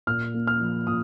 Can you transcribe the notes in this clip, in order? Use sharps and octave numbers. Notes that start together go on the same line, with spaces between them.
A#2 F6
A#3
F6
F3
A#2 D#6